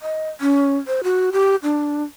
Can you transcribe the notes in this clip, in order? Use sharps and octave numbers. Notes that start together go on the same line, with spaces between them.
D#5
C#4
C5
F#4
G4
D4